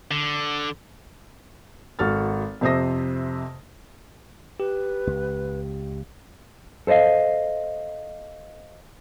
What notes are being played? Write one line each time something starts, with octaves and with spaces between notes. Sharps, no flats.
D3
G#1 F#4 A4 F6 A6
F2 C3 C5 E5 D#6 A#6
G4 B4
C#2
A4 C5 D5 D#5 F5